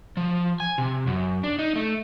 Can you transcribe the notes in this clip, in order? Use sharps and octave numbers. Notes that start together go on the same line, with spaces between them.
F3
G#5
C3
F#2
D4
D#4
A3